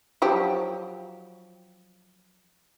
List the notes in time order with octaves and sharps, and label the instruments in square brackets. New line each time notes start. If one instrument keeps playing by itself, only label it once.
[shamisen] F3 F#3 G4